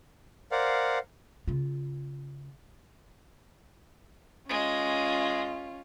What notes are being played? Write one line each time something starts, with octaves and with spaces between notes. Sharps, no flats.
A#4 C5 D5 F5 F#5
C#3 F4
G#3 C#4 F4